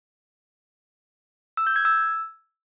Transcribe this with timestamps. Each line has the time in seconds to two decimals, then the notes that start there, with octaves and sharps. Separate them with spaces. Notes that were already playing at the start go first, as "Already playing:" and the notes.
1.57 E6
1.67 G6
1.76 G#6
1.85 E6